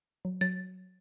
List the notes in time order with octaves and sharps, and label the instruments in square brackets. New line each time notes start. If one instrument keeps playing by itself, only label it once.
[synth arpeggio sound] F#3
[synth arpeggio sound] F#3 [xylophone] A6